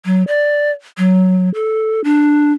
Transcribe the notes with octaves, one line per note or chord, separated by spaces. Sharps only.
F#3
D5
F#3
A4
D4